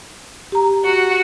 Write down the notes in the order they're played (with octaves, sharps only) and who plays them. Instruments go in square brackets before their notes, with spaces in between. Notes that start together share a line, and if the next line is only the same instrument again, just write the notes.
[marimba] G4 A#5
[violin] F#4 F#5